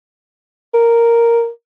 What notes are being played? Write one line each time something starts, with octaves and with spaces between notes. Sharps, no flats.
A#4